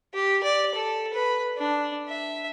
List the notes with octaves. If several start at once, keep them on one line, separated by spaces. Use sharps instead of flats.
G4
D5
A4
B4
D4
E5